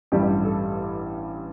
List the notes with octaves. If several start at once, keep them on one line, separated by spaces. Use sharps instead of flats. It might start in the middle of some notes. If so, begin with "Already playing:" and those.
A1 G2 E3 G3 G4
A4